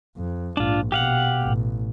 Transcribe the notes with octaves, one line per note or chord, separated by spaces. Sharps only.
F2
A#1 G#2 D4 F4
B2 G4 F5 F#5
A1